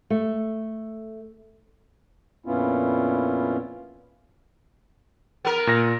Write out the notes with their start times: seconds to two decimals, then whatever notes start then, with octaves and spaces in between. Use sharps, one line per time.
0.10 A3
2.46 F2 A#2 B3 C#4 E4 F4
5.45 B3 A#4
5.67 A#2 A#6